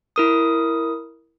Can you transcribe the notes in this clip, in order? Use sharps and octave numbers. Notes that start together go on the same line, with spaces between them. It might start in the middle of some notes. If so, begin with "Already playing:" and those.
E4 A#4 D#6